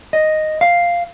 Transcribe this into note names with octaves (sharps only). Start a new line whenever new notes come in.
D#5
F5